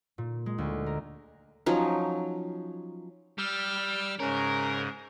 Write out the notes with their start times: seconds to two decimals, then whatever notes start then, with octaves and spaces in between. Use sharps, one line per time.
0.18 A#2
0.46 G#3
0.58 D2
0.86 A#4
1.66 F3 F#3 C#4 D#4
3.38 G3 E6 F6
4.19 G#2 C#3 C#4 A#4